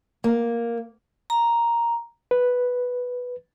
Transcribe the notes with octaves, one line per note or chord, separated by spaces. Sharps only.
A#3
A#5
B4